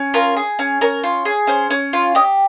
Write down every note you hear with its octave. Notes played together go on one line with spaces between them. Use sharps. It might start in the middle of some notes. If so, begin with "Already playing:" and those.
Already playing: C#4
F4 A#4
G#4
C#4
C#4 A#4
F4
G#4
C#4 C5
C#4
F4
G4 D#5